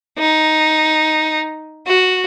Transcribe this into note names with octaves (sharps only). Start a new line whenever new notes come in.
D#4
F#4